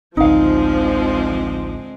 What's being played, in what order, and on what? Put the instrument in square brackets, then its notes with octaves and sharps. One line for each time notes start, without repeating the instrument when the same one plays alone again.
[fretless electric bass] A1 D2 [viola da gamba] D3 G#3 C4 [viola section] F3 [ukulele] D#4 F5